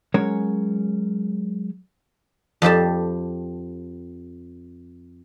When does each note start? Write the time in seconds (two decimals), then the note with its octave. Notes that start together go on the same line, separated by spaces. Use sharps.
0.14 F#3 G#3 C#4 A#4 C#5
2.62 F2 C4 G4 A5